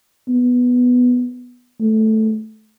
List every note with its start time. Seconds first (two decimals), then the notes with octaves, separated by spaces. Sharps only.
0.29 B3
1.81 A3